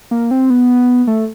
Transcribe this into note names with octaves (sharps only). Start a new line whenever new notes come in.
A#3
C4
B3
A3